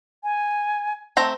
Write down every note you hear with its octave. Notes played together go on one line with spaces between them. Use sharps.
G#5
A3 C4 A5 A#5